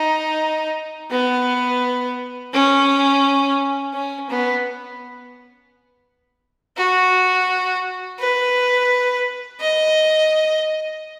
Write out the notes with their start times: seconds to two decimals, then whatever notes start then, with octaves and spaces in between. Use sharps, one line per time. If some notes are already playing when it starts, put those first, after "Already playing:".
Already playing: D#4
1.11 B3
2.53 C#4
3.94 C#4
4.30 B3
6.77 F#4
8.20 B4
9.61 D#5